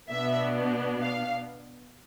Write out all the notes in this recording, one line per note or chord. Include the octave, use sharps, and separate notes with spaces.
B2 B3 D4 E5
F5